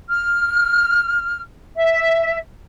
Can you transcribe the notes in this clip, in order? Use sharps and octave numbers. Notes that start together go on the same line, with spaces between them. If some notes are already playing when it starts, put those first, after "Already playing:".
F6
E5